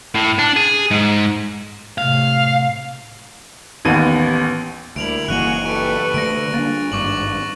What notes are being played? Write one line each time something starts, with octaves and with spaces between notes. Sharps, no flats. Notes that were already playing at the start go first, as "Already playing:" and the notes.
A2
D4
G#4
G#2
A2 C3 F5
A1 D#2 B3 D#7
D2 G3 A#3 E4 D7 F7 F#7
F#1 E3 A#3 F#4 G#4 F#6 D#7 F#7
G4 A4 B4 C#6 D7
D3 A3 A#6 D7
G3 A#3 B3 D4 A6
G#1 G2 C#6 D6 F#7